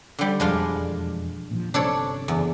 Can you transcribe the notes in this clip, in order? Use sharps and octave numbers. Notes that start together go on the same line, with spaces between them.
D3 G3
E1 F2 F3 G#3 D4 F4
A#2 D3 F3
G1 C3 D4 A4 C#5
F#1 E2